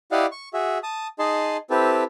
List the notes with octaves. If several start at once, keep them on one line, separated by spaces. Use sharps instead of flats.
E4 G4 D5 D#5 F5 F#5
C#6
F#4 G#4 E5
A5 D#6
D#4 G#4 D#5 A5 C6
C4 E4 G4 A4 B4